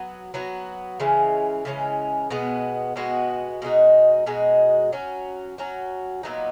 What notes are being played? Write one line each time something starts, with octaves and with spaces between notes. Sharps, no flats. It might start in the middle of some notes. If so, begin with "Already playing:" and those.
Already playing: F#3 B3 F#4
F#3 B3 F#4
C#3 E3 G#3 C#4
C#3 E3 G#3 C#4
B2 G#3 B3 F#4
B2 G#3 B3 F#4
B2 G#3 D#4 F#4
B2 G#3 D#4 F#4
F#3 C#4 F#4
F#3 C#4 F#4
A#2 F#3 B3 D#4